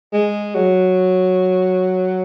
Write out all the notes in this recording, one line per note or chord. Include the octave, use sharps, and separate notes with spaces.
G#3
F#3